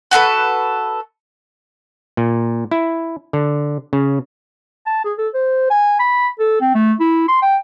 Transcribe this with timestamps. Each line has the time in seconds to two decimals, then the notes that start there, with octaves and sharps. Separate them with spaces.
0.11 F#4 G4 A4 B4
2.17 A#2
2.71 E4
3.33 D3
3.93 C#3
4.86 A5
5.05 G#4
5.18 A4
5.34 C5
5.70 G#5
6.00 B5
6.39 A4
6.61 C4
6.75 A3
7.00 E4
7.28 C6
7.42 G5